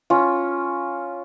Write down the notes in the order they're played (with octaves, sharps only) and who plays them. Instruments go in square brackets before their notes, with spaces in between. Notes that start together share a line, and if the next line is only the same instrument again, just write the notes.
[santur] C#4 F4